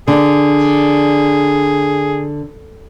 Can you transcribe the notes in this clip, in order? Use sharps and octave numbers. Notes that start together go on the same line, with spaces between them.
D3 G#4